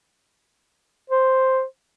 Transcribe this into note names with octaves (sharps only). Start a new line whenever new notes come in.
C5